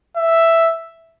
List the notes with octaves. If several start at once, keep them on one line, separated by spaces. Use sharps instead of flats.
E5